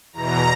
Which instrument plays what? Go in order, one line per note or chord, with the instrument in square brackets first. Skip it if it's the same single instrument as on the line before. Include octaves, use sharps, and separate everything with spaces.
[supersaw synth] E2 B2 A#5